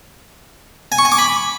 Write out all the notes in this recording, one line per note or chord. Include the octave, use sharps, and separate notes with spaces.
G#5
C#6
G#5
D6
B5